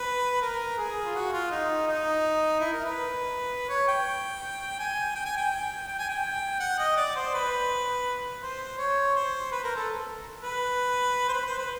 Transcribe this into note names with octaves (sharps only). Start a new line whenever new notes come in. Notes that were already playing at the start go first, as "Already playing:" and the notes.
Already playing: B4
A#4
G#4
F4
F#4
F4
D#4
D#4
E4
A#4
B4
C#5
G5
G#5
G5
G#5
G5
G5
G#5
G5
F#5
D#5
D5
C5
B4
C5
C#5
C5
B4
A#4
A4
B4
C5
B4
C5
B4